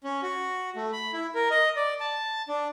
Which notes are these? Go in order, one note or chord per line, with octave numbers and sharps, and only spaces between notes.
C#4
F#4
A3
B5
E4
A#4
D#5
D5
A5
D4